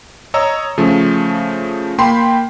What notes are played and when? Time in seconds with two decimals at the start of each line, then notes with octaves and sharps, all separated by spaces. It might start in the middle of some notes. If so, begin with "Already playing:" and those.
0.34 C#5 D#5 A#5 E6
0.78 C#3 F3 A3
1.98 A#3 G5 B5 C6